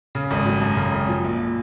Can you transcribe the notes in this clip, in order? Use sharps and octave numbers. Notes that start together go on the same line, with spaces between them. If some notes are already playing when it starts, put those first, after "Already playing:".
C#3
G#1
F#3
F#2
C#3
G#1
F3
A#1